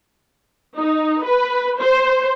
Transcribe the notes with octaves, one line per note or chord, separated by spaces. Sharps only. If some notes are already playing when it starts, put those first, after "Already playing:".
D#4
B4
C5